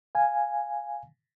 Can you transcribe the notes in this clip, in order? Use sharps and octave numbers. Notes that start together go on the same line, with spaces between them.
F5 G#5